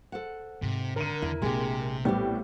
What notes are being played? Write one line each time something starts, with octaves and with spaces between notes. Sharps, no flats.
A4 C5 F#5
G#2 C3 D#3
D3 A#4 D#7
E2 D#3 E4
A#1 C3 G#3 G4
A2 G3 B3 C4 G4